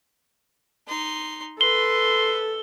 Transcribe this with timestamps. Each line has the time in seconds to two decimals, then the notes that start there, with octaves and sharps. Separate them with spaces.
0.88 D#4 C6
1.61 A4 B4 C6 G7